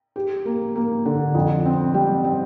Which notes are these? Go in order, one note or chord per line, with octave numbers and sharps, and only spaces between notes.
G4
A#3
A#3
D3
F2
C4
G3
C4